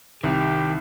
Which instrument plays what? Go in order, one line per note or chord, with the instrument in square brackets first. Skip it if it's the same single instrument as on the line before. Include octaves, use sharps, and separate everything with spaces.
[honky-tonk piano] C2 [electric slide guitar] D#3 [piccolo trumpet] G4